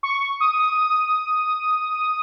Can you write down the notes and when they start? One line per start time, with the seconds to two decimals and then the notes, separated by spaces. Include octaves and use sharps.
0.03 C#6
0.40 D#6
0.59 D#6
0.78 D#6